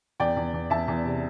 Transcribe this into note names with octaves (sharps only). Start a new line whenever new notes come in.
E2 D5 G5
E2
E2
E2 E5 A5
E2
C3